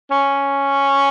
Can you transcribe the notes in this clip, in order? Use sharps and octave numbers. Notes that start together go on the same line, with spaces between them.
C#4